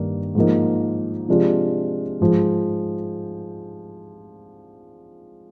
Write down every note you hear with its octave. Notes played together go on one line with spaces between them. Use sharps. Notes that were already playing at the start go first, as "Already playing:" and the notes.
Already playing: G2 D#3 A#3 D4
G#2 F3 A#3 D#4
C3 F3 G#3 D4 F4
G#2 F3 G#3